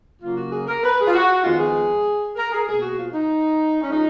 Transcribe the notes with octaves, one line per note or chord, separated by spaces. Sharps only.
C#3 F#3 A#3 F4
F#4
G#4
A#4
B4
G#4
F4
F#4
F2 D#3 G#3 B3 F4
G#4
A#4
G#4
B2 A#3 G#4
F#4
F4
D#4
C#4
F3 G#3 D#4